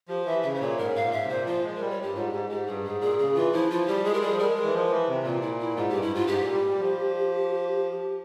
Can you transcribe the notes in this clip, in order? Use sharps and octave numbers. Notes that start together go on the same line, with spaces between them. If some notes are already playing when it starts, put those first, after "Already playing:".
F3 G4
E3 E5
C#3 E5
C5
A#2 C#5
G#2 A#4
G#2 F5
A#2
G#2 E5
C3
A#2 C5
F3 F4
G#3
G3 A#4
C#5
G2 G4
G#2 F4
G#2 G4
G#2 G4
G2 G#4
G#2 G#4
A#2 G#4
C#3 G#4
E3 F4
F3 E4
F3 F4
G3 G4
G#3 G#4
A#4
G3 G#4
F3
G3 A#4
G#3
A#4
E3
F3
E3
C3
A#2 F4
E4
E4
G#2 F4
G2 G4
E4
G#2 F4
G2
G#2 G4
A#2
G3
G3
F3